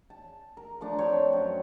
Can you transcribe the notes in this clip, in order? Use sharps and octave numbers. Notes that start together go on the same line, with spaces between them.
A5
A#4
F3 A3 D4
C4 C#5 G5
F#2